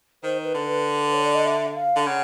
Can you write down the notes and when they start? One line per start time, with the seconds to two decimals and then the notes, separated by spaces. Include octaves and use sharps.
0.23 D#3 C5
0.44 B4
0.54 D3
0.64 B4
1.14 C#5
1.24 D5
1.34 D#5
1.45 E5
1.75 F5
1.96 D3
2.06 C#3 F#5